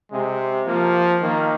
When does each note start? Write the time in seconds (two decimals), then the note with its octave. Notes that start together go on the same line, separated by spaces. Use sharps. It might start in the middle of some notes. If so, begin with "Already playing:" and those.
0.12 C3 G#3
0.66 F3 A#3
1.22 D#3 A#3